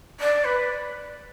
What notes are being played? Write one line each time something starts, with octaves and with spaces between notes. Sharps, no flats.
D5
B4